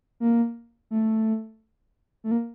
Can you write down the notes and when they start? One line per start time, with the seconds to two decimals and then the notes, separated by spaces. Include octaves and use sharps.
0.20 A#3
0.91 A3
2.24 A3
2.31 A#3